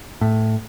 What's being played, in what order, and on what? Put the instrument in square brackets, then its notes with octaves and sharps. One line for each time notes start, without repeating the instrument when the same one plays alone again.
[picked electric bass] A2